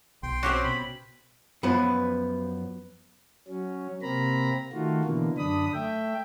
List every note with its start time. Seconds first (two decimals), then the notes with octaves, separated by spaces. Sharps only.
0.23 B1 G5 C6
0.43 C4 C#4 F#4 G4 C5
0.64 B2 B5
1.63 F#2 F3 B3 B4
3.48 F#3 C#4
4.02 C3 A#3 C4 A#5 B5
4.73 D#3 A3 F4 F#4
5.04 B2 D3 E3 A#3
5.38 F#2 D3 D4 B5 D#6
5.73 A3 E5 G5